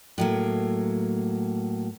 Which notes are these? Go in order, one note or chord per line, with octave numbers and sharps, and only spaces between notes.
A2 F#3 A#3